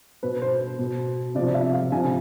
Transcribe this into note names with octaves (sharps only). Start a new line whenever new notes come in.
B2 B4
C5
B2
C3 F3 D5
E5
F5
C3 F3 G#5